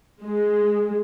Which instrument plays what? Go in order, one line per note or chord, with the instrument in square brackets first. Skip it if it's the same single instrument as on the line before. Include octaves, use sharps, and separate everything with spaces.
[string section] G#3